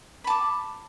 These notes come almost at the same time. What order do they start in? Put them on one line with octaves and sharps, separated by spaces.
B5 A5 D6